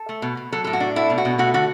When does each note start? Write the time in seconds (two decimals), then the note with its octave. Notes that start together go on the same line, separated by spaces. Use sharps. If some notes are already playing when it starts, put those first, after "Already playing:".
Already playing: A4
0.09 A3
0.22 B2
0.37 B2
0.52 F#3 A4
0.64 A2 A4
0.73 F#4
0.80 D4
0.96 A3 E4
1.10 B2
1.18 F#4
1.25 B2
1.38 A3 F#4
1.54 D3 F#4